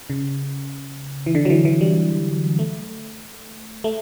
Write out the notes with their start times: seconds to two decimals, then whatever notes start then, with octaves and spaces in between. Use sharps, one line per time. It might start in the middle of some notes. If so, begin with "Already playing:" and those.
0.10 C#3
1.26 E3
1.35 D3
1.45 F#3
1.50 E3
1.65 E3
1.81 G3
2.59 A3
3.84 A3